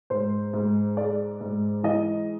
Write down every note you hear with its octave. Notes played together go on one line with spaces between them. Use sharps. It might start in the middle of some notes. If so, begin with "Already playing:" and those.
G#2 C5
G#2
G#3 D5
G#2
E3 D#5